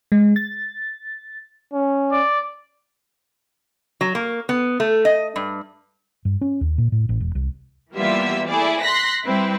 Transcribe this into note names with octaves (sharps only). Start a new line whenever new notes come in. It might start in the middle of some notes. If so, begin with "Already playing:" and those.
G#3
A6
C#4
D5
F#3
A#3
B3
A3
D#5
G2
G2
C#4
D#2
A#2
A2
A1
E1
C2
E3 G3 A#3 B3 F4 E5
A3 E4 G#4 D5
C6 F#6 A#6 B6
G3 C4 E4 B4